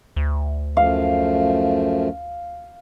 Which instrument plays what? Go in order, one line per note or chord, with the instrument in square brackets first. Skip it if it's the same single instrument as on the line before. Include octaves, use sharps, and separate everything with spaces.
[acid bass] D2
[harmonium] F#2 F3 A3 [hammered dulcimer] F5